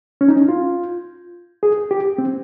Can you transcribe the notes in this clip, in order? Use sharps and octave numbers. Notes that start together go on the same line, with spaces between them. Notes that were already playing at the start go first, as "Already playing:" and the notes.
C#4
D#4
C#4
F4
G#4
G4
C4